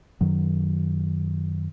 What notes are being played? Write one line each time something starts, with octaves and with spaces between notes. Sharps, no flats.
F#2 D#3 F#3